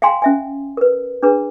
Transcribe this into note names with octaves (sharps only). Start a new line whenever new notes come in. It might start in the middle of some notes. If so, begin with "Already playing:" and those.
F5 G5 G#5 A#5 C6
C#4 E5 G#5
A#4 B4
D4 G#4 B4 A#5